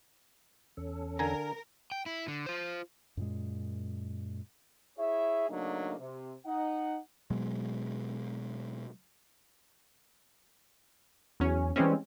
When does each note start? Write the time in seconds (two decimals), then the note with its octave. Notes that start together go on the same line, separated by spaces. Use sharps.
0.77 E2 C#4 A4
1.19 D3 A#4 G#5 A#5
1.92 G5
2.06 E4
2.28 D3
2.46 F4 C5
3.17 F#2 A#2 G#3
4.98 E4 G#4 C#5 E5
5.49 C#3 F#3 A3 A#3 D4 D#4
5.99 C3
6.46 D#4 F#5
7.30 B2 F#3 G#3
11.40 E2 F#3 C#4
11.76 E3 G3 G#3 C4 C#4